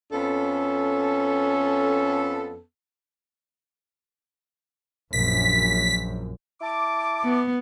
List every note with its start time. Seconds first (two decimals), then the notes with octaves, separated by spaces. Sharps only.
0.12 F2 B3 C#4 A4
5.13 A#1 F#2 B6
6.61 E4 A5 D6
7.25 B3